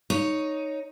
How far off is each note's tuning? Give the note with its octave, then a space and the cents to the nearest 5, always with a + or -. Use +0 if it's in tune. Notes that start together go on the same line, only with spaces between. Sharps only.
D#4 +0 C#5 +0